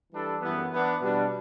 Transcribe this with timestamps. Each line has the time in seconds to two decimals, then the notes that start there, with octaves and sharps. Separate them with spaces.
0.11 E3 G3 D4 A4
0.41 F#2 E3 G3 B3
0.72 E3 B3 D4
1.02 B2 G3 D4